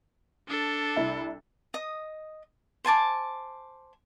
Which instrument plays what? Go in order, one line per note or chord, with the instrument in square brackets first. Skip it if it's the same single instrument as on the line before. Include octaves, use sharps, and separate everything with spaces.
[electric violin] D4 A4
[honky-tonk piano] C2 E4 E5
[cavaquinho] D#5 D#6
C5 G#5 A5 D6